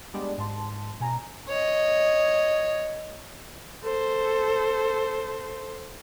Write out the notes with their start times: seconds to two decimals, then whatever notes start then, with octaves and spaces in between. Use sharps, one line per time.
0.14 G3 G#3 B3 D4 G4 D5
0.37 G#2 A5 C6
1.00 B2 G#5 A#5
1.49 C#5 D#5
3.83 A4 C5